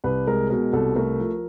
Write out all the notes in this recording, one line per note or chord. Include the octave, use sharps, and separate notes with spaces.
C2 B4
G#3 A#4
B2 A#4
C2 A4
A3 A#4
F3